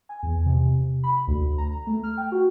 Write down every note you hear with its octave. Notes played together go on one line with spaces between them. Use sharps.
G#5
E2
C3
B5
D2
A#5
A3
F6
G5
F#4